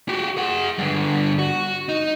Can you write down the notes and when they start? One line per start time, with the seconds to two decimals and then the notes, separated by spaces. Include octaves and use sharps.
0.09 F#4 G4
0.37 G#4 F#5
0.78 G2 D3
1.39 F#4
1.89 D#4